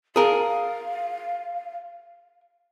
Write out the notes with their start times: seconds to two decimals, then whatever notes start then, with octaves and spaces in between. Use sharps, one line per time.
0.16 G#4 A#4 F5